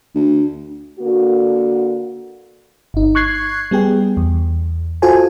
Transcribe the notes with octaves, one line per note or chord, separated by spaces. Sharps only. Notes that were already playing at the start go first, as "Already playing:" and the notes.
D2
D3 A#3 F#4
G1 D#4
C#6 F#6 G#6 C7
G3 B3 G#4 G5
E2
F4 F#4 A4 C5 G#5